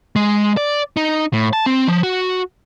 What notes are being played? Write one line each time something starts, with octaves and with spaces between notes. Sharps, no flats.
G#3
D5
D#4
A2
A5
C4
F3
F#4